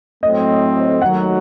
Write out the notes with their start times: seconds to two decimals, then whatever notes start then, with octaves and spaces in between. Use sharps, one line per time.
0.23 A2 F#3 A3 C4 D#5
1.02 D#2 D#3 F#3 A3 F#5